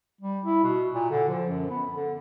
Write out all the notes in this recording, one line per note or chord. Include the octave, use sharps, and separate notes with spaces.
G3
E4
B2
A#2
D3
F3
F#2
B3
D3